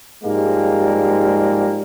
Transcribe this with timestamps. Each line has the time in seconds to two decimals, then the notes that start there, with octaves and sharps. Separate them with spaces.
0.24 G#2 F3 G3 G#3 A#3